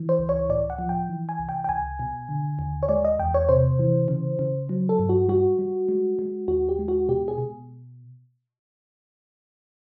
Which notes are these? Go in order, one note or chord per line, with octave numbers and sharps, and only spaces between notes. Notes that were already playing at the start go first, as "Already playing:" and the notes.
Already playing: E3
C5
C#2
C#5
A2 D5
F#5
F3
G5
E3
G#5
C2
G5
G5
C#2 G#5
B2
D3
D#2
C#5
G#3 D5
D#5
E2 G5
C#5
C3 C5
E3
C#3
C#3
F#3
A4
G2
F#4
G3 F#4
G3
G#3
G#3
D#2 F#4
G4
G#3
F#4
B2 G4
G#4
B2